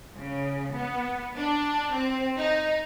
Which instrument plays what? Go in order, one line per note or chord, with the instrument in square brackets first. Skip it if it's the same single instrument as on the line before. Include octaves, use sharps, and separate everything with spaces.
[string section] C#3
B3
D4
C4
D#4